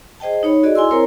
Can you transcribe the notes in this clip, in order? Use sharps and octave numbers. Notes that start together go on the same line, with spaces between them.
G#4 C5 D#5 G5 A5
D#4 C#5 B5
F#4 G#4 A4 D5 D#5
E4 G#5 C6 E6
C4 E4 A#4 C5 C#5 A#5